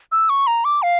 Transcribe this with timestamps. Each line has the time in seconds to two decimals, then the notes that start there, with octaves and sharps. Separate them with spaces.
0.12 E6
0.30 C#6
0.47 A#5
0.65 D6
0.82 F5